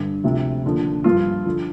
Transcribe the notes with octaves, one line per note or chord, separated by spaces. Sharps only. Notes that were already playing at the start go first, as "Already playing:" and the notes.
Already playing: G2 D3
D2 C3 F3
D#2 D3 F3
G2 F3 F4
D3 F3